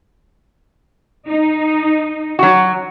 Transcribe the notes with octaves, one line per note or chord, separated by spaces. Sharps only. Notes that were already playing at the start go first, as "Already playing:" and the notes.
D#4
F#3 F#4